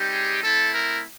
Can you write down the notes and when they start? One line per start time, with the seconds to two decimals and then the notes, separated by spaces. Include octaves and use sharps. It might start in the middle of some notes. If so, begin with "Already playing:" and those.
Already playing: G3 C4 D#4 G4
0.12 G#4
0.43 A3 C4 E4 A4
0.74 A#4